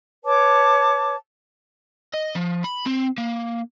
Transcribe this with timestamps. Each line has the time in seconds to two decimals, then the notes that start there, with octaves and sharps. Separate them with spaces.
0.24 B4 C#5 A5 D6
2.14 D#5
2.35 F3
2.64 B5
2.86 C4
3.18 A#3